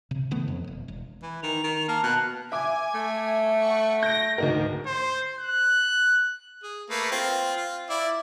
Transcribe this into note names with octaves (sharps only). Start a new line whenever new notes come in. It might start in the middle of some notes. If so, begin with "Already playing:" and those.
C3
C#3 E3 A3 B3
F2
E1
E1
E3
D#3 F7
D#3
A#3 A5 F6
B2 F#6
E5 G#5 D6
A3
F#5 C#6
G6 A#6 D7
D2 G#2 D#4 A#4
C5
F#6
G#4
A3 A#3 B4
C4 F4
F4
E4 D5